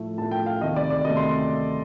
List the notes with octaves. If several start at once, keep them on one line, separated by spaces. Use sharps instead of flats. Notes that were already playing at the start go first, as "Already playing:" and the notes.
Already playing: A2 F3 A3
A2 F3 A3 A5
G5
F5
D2 C3 D#3 A3 D#5
D5
D5
D2 C3 D#3 A3 D#5
C6